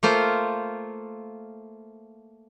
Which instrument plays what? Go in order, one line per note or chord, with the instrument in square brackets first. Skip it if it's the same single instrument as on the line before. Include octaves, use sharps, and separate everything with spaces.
[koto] A3 A#3 F4 C5